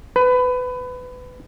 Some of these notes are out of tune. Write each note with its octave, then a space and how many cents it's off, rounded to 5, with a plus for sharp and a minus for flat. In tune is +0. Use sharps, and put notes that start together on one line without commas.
B4 +20